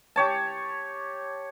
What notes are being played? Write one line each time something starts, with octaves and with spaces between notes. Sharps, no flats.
G4 C#5 A5